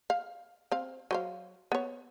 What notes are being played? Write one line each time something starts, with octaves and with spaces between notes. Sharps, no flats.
F5
C4 F5
F#3 C5 F5
B3 C#5